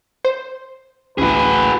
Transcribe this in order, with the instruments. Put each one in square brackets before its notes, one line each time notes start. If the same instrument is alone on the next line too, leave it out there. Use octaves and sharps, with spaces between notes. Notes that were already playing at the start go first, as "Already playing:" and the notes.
[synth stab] C5
[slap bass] A1 D2 [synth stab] C#4 E4 [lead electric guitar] F#4 G#4 [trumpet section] A4 B4